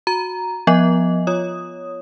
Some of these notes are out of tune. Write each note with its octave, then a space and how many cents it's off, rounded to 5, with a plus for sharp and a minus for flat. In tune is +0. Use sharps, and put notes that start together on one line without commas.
F#4 -15 A#5 +0
F3 +20 B3 +0 D#5 +0
F4 +0 C#5 +5 D#6 +0